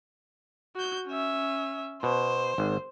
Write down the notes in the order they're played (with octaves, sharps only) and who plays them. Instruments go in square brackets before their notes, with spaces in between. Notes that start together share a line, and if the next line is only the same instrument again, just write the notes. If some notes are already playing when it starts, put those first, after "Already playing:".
[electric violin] F#4 G6
C#4 E5
[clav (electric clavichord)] B2 [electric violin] C5
[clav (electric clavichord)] G#1